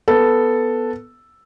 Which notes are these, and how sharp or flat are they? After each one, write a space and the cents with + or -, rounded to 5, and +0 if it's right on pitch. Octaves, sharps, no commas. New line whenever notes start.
B3 +0 A4 +0